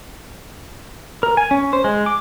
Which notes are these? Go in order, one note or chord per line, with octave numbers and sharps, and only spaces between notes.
A#4
G#5
C#4
C5
G#3
D6